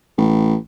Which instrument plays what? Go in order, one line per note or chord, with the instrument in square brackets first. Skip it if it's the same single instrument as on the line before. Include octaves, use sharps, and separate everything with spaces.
[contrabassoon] A1